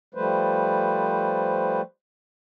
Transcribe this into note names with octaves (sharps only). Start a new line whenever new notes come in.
F3 G3 A3 B4 C5